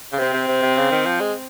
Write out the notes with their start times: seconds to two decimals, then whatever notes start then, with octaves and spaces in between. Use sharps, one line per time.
0.12 C#3
0.18 C3 C4
0.33 C3
0.48 C3
0.62 C3
0.77 C#3
0.92 D#3
1.06 F3
1.20 G#3